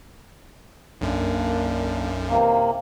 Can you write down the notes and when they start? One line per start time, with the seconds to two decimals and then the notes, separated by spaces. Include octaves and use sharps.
1.01 B1 F#2 A#3 D4
2.29 C3 E3 A#3 C4 D#4